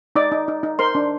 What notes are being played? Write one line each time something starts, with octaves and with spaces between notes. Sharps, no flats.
D#4 D5 D6
D#4
D#4
D#4
A#4 C5 C6
D4